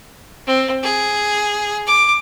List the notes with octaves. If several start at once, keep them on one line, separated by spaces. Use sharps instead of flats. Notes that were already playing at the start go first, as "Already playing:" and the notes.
C4
G#4
D6